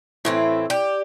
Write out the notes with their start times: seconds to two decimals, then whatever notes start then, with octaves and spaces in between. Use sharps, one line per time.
0.25 A2 E3 C4 E4
0.70 G4 D5